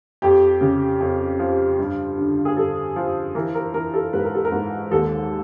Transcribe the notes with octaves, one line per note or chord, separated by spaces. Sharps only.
F2 G4
C#3
F2
F3
G2
D3
G#4
G2 A4
F3
E3 A#4
A#4
E3 A#4
A4
G#2 B4
A#4
A4
A#4
G#2
D#2 A4